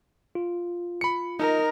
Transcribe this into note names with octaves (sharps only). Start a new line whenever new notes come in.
F4
B5 C#7
D#4 A#4 D#5